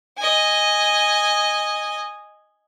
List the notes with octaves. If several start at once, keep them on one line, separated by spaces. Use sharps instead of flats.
D#5 G#5